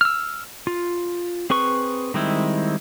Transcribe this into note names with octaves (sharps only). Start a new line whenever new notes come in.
E6 F6
F4
C4 G#4 B4 C#6
D#3 G3 G#3 C4 E4